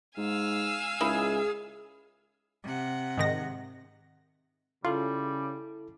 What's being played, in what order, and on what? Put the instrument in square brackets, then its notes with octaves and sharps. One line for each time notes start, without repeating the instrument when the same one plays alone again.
[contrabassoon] G#2 [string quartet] F5 G#5 E6
[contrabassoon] C#2 [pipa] A#3 D#4 E4 [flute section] G#4
[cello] C3 F#5
[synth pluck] G#2 D#3 A#6
[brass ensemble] C#3 [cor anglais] G3 [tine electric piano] E4 A4 [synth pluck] F4